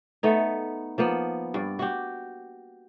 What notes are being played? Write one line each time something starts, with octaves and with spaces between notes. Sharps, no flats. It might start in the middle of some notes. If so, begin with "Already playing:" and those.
A3 B3 D#4
F3 A#3 B3
G2 D5
F#4 G4